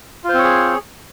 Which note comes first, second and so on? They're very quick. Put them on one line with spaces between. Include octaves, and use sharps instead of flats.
F4 C5 C4 C#5 G#4